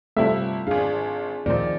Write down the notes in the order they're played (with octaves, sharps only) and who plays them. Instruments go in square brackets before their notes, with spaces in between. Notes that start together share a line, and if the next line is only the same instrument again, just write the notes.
[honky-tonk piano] G1 E4 E5 [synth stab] C3 G3 A3 [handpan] C4 F4
[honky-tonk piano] G#1 F5 [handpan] D4 G#4
[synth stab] D2 A#2 C4 [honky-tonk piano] D#3 F3 [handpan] D5